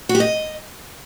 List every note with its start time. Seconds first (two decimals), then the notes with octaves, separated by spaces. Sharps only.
0.09 F#4
0.15 G4
0.20 D#5